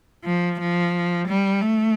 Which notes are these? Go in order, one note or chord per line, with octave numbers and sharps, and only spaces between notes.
F3
F3
G3
A3